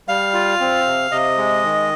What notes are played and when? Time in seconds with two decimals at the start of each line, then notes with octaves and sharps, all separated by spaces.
0.08 G3 F5
0.34 F4
0.60 C4
0.86 C3
1.11 C3 D#5
1.37 G#3
1.64 D#3